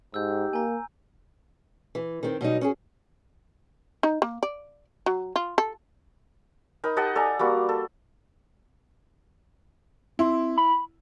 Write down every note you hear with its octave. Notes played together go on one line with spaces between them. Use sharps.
G#2 D#4 G4 E6 G6
A#3 G#5 A#5
E3
D#3 C4
B2 F#3 G3 D#4
C#4 F#4 G#4
D#4
A#3
D5
F#3
F4
A4
D#4 A#4 B5
G4 D#5 F#5 A5
A4 D5 G#5 A#5
G3 A#3 F#4
A4
C4 E4
B5